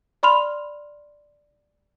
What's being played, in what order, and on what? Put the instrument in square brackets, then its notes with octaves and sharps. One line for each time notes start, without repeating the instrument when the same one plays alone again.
[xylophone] D5 B5 C6 F6 F7